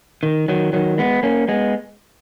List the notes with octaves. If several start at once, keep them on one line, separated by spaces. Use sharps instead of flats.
D#3
D#3 F#3
D#3 F#3
G#3 B3
A#3 C#4
G#3 B3